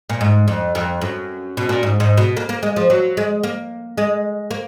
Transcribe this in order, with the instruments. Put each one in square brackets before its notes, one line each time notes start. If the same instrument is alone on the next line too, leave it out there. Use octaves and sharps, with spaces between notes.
[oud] A#2
G#2
F2
F2
F#2
B2
A#2
G#2
G#2
B2
A#3
A#3
G#3
F3
F#3
G#3
A#3
G#3
A#3